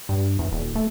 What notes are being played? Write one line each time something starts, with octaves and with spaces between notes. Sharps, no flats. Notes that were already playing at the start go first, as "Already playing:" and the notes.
G2
E2
D#1
A3